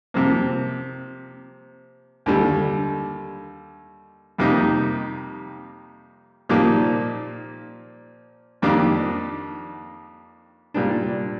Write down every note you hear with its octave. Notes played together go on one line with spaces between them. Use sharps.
C3 F3 A#3
D#2 D3 G3
F2 C3 G3 A#3 D#4
A#2 F3 A#3 D#4 G4
F2 D#3 A#3 D4 G4
A#2 G3 D4